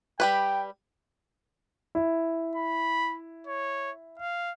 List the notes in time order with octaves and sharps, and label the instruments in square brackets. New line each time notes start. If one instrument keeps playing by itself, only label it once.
[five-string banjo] G3 G4 B4 [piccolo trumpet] G5
[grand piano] E4
[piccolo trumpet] B5
C#5
F5